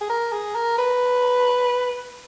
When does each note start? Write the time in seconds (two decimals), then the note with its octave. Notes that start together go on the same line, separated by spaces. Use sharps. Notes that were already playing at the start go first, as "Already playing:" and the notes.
0.01 G#4
0.10 A#4
0.32 G#4
0.55 A#4
0.78 B4